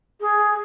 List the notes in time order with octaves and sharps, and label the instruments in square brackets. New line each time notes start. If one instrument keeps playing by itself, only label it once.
[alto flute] G#4